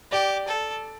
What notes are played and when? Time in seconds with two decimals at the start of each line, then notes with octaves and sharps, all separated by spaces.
0.12 G4 D5
0.48 A4